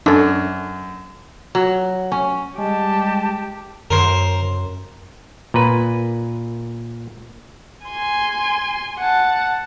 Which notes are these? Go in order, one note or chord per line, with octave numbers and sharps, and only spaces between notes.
F#2 D4 A4
F#3
C#4
G3 G#3 G4 A5
F#2 A#4 C5
A#2 B4
G#5 C6
F#5 A5